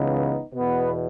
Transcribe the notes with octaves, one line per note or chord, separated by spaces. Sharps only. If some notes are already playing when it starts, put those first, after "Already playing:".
Already playing: C#2 C#3 E3 B3 D#4
E2 B2 B3